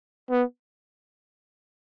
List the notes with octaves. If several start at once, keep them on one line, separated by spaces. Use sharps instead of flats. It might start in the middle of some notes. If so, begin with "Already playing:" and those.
B3